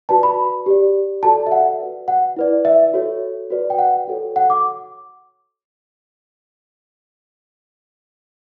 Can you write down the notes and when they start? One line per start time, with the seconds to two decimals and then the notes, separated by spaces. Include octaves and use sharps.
0.09 F#4 B4 D5 A5
0.23 B5
0.66 G4 D5
1.23 F#4 A4 D5 A5
1.47 E5
1.52 F#5
1.80 F#4 B4 D5
2.08 F#5
2.36 E4 B4 D5
2.65 E5
2.94 F#4 A4 C#5
3.50 F#4 B4 D5
3.70 G5
3.78 F#5
4.07 F#4 A4 C#5
4.36 F#5
4.50 D6